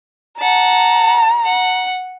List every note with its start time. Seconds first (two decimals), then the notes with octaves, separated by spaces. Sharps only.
0.39 F#5 A5 A#5
1.44 F#5